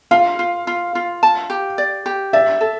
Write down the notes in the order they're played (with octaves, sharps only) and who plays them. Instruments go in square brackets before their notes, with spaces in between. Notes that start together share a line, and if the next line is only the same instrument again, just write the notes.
[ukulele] F4 [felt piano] F5
[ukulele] F4
F4
F4
A5
G4
D5
G4
[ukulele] D5 [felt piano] E5
[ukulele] A4